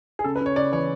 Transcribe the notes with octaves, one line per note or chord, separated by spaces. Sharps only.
G#4
C#3 A4
B4
C#3 C#5
C#3 D5
E3 C#5